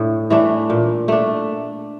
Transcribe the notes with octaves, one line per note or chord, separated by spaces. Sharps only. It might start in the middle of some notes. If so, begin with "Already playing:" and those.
Already playing: A2 D4
E3 A3 D4
A#2
A3 D4